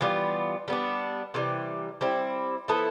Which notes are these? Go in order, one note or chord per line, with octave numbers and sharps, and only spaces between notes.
E3 G3 B3 F4
G3 B3 D4
C3 E3 G3
G3 C4 E4
F3 B3 E4 A4